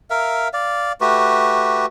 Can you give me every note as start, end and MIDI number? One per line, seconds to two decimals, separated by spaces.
0.10 0.48 70
0.10 0.48 76
0.10 0.48 77
0.53 0.92 74
0.53 0.92 77
1.01 1.86 57
1.01 1.86 66
1.01 1.86 67
1.01 1.86 71